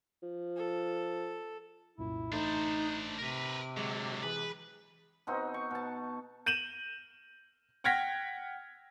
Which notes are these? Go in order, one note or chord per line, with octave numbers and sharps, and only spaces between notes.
F3
A4
C2 F#2 A#2 E4
A1 A3 D4 D#4 C5 B5
C3 A#4 B4
D3 F#3 G#3
E3 G#4 B4 B6
B2 C4 D#4 F#4
C#6
B2 A5
G6 D#7 E7 F#7
F#5 G5 F6 G#6 A#6 B6